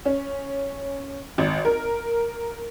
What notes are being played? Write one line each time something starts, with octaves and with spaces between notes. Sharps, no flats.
C#4
G#1
A#4